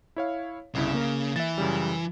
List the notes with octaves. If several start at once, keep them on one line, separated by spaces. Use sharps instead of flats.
E4 C#5 F5
G1 C2 C#3 E4
A#3 A#4
E3 E5 A6
F#2 C#3 G3